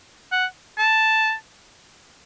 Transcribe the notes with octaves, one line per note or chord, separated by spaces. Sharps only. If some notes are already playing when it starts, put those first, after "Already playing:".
F#5
A5